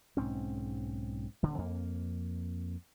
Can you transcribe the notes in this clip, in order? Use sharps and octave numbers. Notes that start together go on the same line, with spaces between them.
B1 G#2 C4 C#4
D#1 D3
F2 A#3